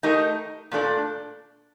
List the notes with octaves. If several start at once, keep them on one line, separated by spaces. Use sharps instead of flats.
A3 D#4 G4 A#4 D#5
A#2 A3 D4 A4 D5